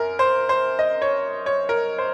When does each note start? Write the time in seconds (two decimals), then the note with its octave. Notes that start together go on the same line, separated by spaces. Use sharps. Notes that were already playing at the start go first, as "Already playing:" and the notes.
Already playing: F#2 A#4
0.19 C5
0.49 C5
0.79 D#5
1.02 C#5
1.46 C#5
1.69 A#4
1.98 C5